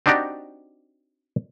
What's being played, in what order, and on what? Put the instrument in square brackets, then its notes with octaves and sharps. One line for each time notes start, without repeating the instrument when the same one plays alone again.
[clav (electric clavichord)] C4 D4 D#4 F#4 G4 D5